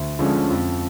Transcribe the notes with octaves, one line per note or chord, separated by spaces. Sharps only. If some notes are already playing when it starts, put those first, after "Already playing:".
Already playing: D2
D3 F3 G#3 C#4
F2